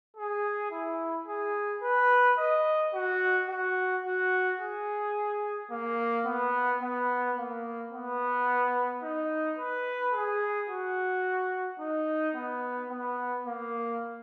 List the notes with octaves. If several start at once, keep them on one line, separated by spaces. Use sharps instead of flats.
G#4
E4
G#4
B4
D#5
F#4
F#4
F#4
G#4
A#3
B3
B3
A#3
B3
D#4
B4
G#4
F#4
D#4
B3
B3
A#3